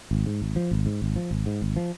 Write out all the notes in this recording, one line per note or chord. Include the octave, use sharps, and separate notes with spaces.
G#1
G#2
G#1
F3
G#1
G#2
G#1
F3
G#1
G#2
G#1
F3